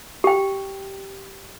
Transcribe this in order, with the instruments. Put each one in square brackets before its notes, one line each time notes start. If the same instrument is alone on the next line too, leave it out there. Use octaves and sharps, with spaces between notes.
[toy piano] G4 G5